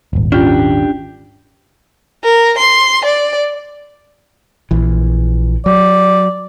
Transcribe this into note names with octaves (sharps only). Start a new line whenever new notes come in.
D#1 G#1
C#4 D4 F4 G4
A#4
C6
D5
A#1 E3
F#3 D5